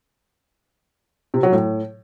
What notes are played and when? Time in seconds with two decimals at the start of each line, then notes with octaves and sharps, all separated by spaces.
1.34 C3
1.43 F#3
1.52 A2